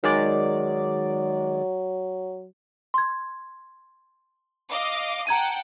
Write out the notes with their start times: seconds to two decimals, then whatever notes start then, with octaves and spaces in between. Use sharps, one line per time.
0.03 D#3 F#3 G#3 D5
2.94 C6 G#6
4.69 D#5 F5 D6
5.27 F#5 G5 A5 A#5 G#6 D#7